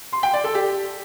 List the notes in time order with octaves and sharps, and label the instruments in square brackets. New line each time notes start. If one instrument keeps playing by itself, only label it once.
[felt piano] C6
G5
D5
A4
G4